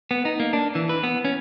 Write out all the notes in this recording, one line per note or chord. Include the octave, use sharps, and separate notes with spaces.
B3
D#4
A#3
D4
E3
B4
B3
C#4